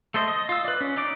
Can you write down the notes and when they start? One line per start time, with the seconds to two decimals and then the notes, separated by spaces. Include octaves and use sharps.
0.14 A3 A4 C5 D#5
0.28 D#5
0.49 F4 E6
0.65 B4 D5
0.81 C#4
0.97 D#4 D5 D6